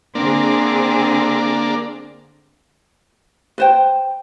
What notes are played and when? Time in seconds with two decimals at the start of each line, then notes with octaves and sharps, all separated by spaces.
0.15 D3 A#3 C4 D4 G#4
3.58 B4 C5 G5